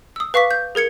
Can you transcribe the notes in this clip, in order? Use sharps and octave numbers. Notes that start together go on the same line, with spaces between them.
D#6 E6
B4 F5 C#6 D6 B6
G6
G#4 A#4 G#6 C#7